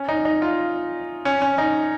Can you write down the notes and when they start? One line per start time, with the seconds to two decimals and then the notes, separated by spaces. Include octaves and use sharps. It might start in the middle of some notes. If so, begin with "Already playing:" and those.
Already playing: C#4
0.09 D#4
0.25 D#4
0.42 F4
1.25 C#4
1.42 C#4
1.58 D#4